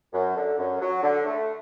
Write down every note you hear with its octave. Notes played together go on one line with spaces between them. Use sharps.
F#2
D3
F#2
F#3
D3
A3